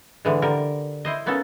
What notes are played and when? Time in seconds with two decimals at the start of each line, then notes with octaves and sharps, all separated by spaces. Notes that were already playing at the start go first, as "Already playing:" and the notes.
0.25 D3 E3 G#3
0.42 D3 G3 A#4
1.05 E4 C5 D#5
1.26 A#3 B3 C#4 D#4 A4